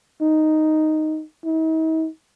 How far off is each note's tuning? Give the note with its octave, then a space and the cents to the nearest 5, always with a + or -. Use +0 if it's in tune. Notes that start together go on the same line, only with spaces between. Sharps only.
D#4 +0
D#4 +45